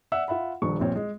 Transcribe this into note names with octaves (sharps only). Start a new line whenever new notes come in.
D5 E5 F#5 E6
F4 E5 F#5 B5
D#1 D#2 F3 D4 C#6
A#1 A#2 C4 C#5
G#3